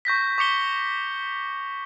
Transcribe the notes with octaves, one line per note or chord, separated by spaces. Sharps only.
C#6 G6 A#6 B6
C#6 D6 C#7 G7